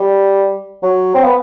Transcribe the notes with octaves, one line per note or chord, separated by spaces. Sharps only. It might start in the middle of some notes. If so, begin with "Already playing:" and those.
Already playing: G3
F#3
C4
B3